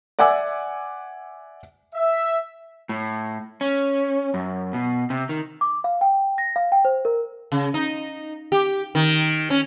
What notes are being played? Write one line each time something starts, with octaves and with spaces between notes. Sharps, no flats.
D5 E5 F#5 G#5 D6 E6
E5
A2
C#4
F#2
B2
C3
D#3
D6
F5
G5
A#6
F5
G5
C5
A#4
C#3
D#4
G4
D#3
C#4